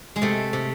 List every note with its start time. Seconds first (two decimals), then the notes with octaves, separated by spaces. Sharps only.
0.16 G#3
0.22 C3 A3
0.53 C3